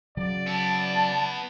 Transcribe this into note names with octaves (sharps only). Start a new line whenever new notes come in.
C#3 F#3 D5
B3 E4 A5